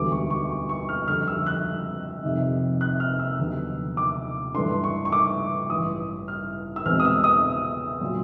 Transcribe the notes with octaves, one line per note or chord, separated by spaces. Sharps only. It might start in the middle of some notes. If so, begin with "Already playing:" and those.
Already playing: E1 D2 D3 G3 B3 D6
C#6
C#6
C#6
C#6
F6
F2 D3 G3 F6
E6
F#6
F2 C3 D#3
F#6
F6
E6
F1 D#2 D3 F#3 B3
D6
G2 E3 A3 D4 C6
C#6
C#6
D6
A1 G2 E3 D#6
F6
E6
E2 B2 G#3 C4 F6
D#6
E6
D#6
A#2 F#3